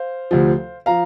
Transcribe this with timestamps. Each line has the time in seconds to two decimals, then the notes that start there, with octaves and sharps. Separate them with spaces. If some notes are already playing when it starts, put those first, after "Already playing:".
Already playing: C5 F5
0.31 D2 C3 F3
0.86 F3 F5 A#5